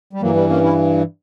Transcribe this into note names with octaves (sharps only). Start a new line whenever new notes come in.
G3
G2 E3 F#3 A#3
G3 B3
A#3 C#4
C#4 E4